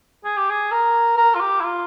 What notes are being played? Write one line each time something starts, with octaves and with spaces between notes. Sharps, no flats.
G#4
G4
G#4
A#4
A#4
F4
G4
E4
F4